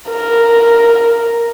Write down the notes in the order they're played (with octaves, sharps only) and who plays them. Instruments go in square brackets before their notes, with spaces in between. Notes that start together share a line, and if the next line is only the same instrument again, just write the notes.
[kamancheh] A#4